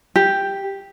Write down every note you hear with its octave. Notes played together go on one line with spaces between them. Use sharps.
G4